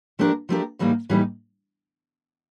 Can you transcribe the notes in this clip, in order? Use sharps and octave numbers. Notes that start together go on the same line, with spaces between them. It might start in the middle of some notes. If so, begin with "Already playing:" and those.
F3 A3 D4 G4 A#4
F3 A3 D4 G4 A#4
A2 E3 G3 A#3 D#4
A2 E3 G3 A#3 D#4